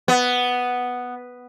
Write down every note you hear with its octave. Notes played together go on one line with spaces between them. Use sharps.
B3